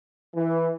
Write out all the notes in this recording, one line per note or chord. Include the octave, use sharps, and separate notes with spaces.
E3